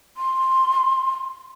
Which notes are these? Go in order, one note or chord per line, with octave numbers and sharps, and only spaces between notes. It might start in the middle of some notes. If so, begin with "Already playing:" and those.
C6